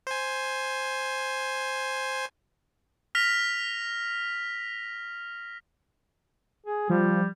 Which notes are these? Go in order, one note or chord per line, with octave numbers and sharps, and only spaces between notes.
C5 G#5
F6 A#6 B6 F7
G#4
F3 G3